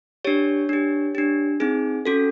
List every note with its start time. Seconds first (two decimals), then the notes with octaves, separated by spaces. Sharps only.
0.25 D4 G4 C#5
0.69 D4 G4
1.15 D4 G4
1.60 C4 D#4 G#4
2.06 C#4 F#4 A4